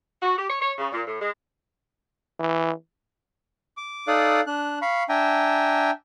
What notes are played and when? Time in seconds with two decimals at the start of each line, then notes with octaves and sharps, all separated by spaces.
0.21 F#4
0.37 G4
0.49 C#5
0.61 C#5
0.77 C#3
0.91 A#2
1.06 A2
1.20 G#3
2.40 E3
3.77 D6
4.08 D#4 A4 D5 F5 D#6 F#6
4.47 D4 F#6
4.82 F5 B5 C#6
5.09 D4 E5 G5 G#5 A#5